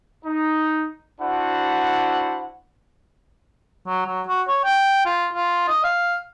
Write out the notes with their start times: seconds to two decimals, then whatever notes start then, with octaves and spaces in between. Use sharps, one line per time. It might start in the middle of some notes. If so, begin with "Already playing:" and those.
0.25 D#4
1.21 D4 E4 F#4 C5 F#5
3.87 F#3
4.06 F#3
4.28 F#4
4.48 C#5
4.65 G5
5.06 F4
5.34 F4
5.68 D#5
5.84 F5